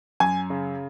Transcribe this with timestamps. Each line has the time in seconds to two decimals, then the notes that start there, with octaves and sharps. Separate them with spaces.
0.20 F#2 G#5
0.50 C#3